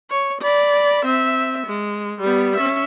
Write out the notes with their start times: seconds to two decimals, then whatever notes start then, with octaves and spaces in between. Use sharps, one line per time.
0.10 C#5
0.41 D5 B5
1.05 C4 E5
1.67 G#3
2.21 G3 B3
2.56 C#4 E5